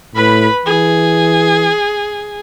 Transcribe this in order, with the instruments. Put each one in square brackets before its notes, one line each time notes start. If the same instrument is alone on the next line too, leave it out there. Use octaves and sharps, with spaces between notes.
[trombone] A2 [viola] B4 B5
[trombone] E3 [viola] G#4